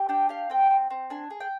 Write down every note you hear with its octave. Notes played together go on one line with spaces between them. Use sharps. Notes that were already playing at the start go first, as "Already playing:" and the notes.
Already playing: G4
D4 G5
G4 F5
C4 G5
C4
C4
D4 G#5
G#4
G5